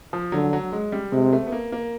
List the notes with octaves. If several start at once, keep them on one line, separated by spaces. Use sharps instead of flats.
F3
D3 F#3
F#3
G#3
G3
C3 G#3
A3
B3
A#3
A#3